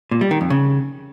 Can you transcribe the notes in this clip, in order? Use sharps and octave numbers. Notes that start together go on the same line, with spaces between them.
A#2
G3
D#3
F2
C#3